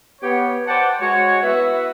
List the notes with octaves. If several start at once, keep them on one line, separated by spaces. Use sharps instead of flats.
B3 G4 C#5
B4 C5 D5 F#5 G5 A5
G#3 F#4 C#5
B3 E4 F#4 B4 E5